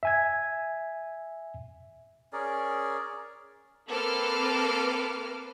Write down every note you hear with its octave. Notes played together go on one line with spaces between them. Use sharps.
E5 G#5 G#6
C#4 G#4 A#4 D5
A#3 C4 A4 B4 D6 F6